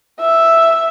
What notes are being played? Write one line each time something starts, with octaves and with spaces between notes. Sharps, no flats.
E5